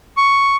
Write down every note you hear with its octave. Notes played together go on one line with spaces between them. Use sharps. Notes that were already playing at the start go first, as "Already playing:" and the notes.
C#6